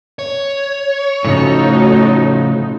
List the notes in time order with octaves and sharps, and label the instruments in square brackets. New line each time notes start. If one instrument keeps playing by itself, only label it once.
[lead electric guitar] C#5
[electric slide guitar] A2 C#3 F3 [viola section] A3 D#4 F#4